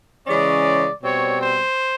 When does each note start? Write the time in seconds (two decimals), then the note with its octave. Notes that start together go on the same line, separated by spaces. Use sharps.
0.27 C#3 E3 G#3 C#4 D5
1.02 B2 G3 C4 C#5
1.40 C5